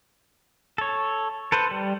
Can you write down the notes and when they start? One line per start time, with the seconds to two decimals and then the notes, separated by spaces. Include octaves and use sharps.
0.78 A4 C#5
1.52 A4 B4 C5
1.71 G3